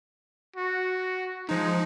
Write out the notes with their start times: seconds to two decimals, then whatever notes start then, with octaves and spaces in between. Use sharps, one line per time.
0.56 F#4
1.49 F3 G#3 D#4